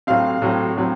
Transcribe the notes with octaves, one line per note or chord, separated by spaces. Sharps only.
A2 F#3 C4 F5
A2 F#3 C4
A2 F#3 C4